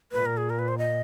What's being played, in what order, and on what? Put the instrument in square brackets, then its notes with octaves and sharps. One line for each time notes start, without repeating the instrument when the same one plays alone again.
[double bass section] A#2 [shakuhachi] B4
[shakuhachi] A#4
G#4
A#4
B4
C5
D#5